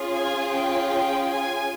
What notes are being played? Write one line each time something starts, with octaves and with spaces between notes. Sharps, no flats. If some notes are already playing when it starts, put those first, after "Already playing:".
Already playing: C#4 F4 G#4
G#5
G5
G5
G#5